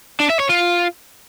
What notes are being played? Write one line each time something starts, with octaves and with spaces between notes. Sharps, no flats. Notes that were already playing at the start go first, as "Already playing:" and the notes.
D4
E5
C#5
F4